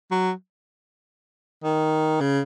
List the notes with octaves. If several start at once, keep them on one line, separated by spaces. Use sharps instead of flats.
F#3
D#3
C#3